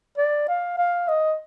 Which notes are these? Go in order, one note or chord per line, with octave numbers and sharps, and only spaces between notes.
D5
F5
F5
D#5